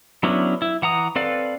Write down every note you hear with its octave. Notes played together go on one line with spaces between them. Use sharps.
F#3 B3 C#4 D4 E4
E4
E3 F#5 A#5 D#6
C4 A4 B4 D5 F5